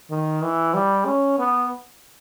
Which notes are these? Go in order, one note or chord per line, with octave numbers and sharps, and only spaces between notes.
D#3
E3
G3
C#4
B3